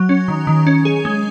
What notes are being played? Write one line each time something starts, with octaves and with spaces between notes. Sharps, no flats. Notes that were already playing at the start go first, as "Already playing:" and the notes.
Already playing: F#3
C#4
D#3
D#3
C#4
G#4
G#3